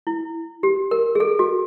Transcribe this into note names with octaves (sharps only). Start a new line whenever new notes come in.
E4
G4
A#4
G#4
A4
F#4